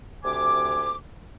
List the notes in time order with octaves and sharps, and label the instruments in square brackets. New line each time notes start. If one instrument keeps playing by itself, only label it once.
[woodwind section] D2 C3 G#5 D6